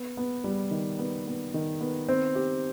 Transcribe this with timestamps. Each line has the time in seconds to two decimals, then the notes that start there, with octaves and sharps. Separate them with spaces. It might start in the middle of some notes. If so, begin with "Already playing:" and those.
Already playing: B3
0.17 B3
0.44 G3
0.71 D#3
0.99 B3
1.27 B3
1.54 D#3
1.81 B3
2.09 C4
2.35 G4